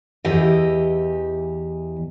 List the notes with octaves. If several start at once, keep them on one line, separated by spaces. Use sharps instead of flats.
E2 E3 G4 D#5